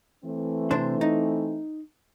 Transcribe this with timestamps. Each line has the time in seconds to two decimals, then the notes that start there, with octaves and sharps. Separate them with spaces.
0.25 E3 A3 C4
0.71 C3 D4 C5
1.01 D#4